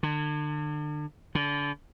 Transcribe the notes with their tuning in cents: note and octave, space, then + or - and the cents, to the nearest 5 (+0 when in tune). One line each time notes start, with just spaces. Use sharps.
D3 +35
D3 -30